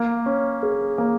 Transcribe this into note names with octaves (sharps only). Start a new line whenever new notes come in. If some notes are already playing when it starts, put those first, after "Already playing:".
Already playing: A#3
C#4
G#4
A#3